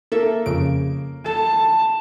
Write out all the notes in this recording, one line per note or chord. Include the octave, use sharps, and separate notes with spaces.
A#3 A4 E5
F2 C#3 D7
A4 A5